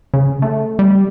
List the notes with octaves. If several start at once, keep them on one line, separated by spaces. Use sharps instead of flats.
C#3
A3
G3